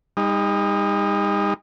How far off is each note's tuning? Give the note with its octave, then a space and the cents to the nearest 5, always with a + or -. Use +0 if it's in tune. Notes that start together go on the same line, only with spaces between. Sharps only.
G3 +45 D#4 +5